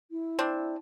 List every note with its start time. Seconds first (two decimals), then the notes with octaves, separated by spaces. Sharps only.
0.11 E4
0.39 C4 D4